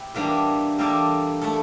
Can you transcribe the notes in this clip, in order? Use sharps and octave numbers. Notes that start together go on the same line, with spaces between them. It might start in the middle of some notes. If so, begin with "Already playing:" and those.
Already playing: E4 G4
E2 E3 G3 A#3 D4
G3 A#3 E4 A4 D5
A3 E4 A4